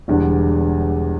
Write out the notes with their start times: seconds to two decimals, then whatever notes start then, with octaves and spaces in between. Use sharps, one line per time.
0.08 E1 E2 D3 G3 D4